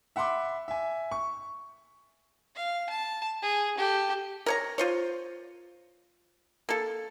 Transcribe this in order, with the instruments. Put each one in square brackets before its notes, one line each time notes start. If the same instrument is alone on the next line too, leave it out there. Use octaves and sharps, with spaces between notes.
[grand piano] E5 F#5 B5 C6 D6
E5 G#5
C#6
[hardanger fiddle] F5
A5
G#4
G4 A4
[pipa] A#4 C#5 A#5
F4 C5 C#5
A#3 A4